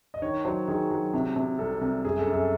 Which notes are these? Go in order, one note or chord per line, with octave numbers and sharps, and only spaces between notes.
D#5
D#3 C#5
F#3 C5
D#3 G#4
F#3
C3
C3
C2 A4
C2
F#2 G#4
A4
F#2
A4